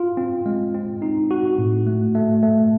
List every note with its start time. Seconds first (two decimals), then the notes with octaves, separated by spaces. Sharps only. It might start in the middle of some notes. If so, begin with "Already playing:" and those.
Already playing: F4
0.17 C4
0.46 G#3
0.74 C4
1.02 D#4
1.31 F#4
1.58 A2
1.87 A3
2.15 A3
2.43 A3